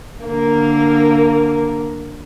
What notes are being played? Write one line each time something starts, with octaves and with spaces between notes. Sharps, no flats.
D3 A#3 A#4